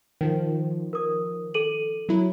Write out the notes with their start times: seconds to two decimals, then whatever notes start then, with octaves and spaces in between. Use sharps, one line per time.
0.21 D#3 F3
0.93 A#4 D#6
1.54 A4 D#7 F#7
2.09 F#3 E4